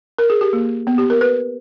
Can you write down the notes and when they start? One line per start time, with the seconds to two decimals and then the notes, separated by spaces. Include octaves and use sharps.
0.18 A#4
0.30 G#4
0.41 G4
0.53 A#3
0.87 B3
0.98 G4
1.10 A#4
1.21 B4